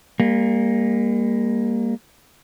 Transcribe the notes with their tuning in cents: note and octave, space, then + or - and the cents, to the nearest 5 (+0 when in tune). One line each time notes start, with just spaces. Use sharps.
G3 +45 A#3 +0